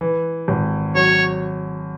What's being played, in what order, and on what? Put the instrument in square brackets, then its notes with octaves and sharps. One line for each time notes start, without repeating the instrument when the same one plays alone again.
[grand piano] E3
G#1
[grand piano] F#3 [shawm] C#5